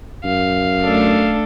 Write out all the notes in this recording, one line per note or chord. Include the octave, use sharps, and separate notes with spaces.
F#2 F5
A3 D4 A4